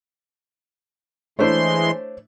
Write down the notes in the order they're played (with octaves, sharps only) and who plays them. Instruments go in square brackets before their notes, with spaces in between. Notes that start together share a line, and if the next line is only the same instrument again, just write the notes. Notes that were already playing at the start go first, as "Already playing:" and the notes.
[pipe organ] E3 G#3 C6 [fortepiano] A3 D4 E4 [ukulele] C5 C#5